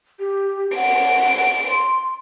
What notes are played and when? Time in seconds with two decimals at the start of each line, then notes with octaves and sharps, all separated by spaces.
0.20 G4
0.76 F#5 D7
1.70 C6